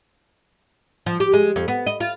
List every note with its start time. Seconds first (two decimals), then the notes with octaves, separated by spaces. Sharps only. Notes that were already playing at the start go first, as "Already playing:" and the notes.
1.06 F3
1.20 G4
1.33 G#3
1.56 F2
1.68 B3
1.86 D#5
2.00 F4